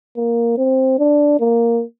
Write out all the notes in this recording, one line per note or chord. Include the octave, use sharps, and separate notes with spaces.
A#3
C4
D4
A#3